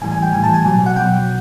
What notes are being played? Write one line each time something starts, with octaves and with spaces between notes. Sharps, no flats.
A2 E3 G3 G#5
G#5
G5
A2 E3 G3 G#5
A5
G#5
B2 F#3 G#5
F#5
B2 F#3 G5